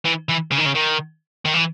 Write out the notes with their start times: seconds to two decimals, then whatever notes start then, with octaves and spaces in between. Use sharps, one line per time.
0.05 E3
0.29 E3
0.52 C#3
0.58 D#3
0.66 C#3
0.75 D#3
1.45 D#3
1.54 E3